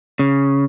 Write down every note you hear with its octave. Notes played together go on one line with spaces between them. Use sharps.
C#3